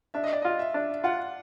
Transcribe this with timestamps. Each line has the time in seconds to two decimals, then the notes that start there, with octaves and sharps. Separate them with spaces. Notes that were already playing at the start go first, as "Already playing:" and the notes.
0.14 D4 E5
0.24 D#5
0.33 D5
0.42 F4 D#5
0.59 E5
0.74 D4
1.04 F4 F#5